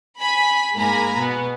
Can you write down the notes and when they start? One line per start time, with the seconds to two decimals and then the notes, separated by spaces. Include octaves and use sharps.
0.17 G#5 B5 B6
0.75 G#2 G#3 A#3 G#5 A#5 B5
1.18 B2 B3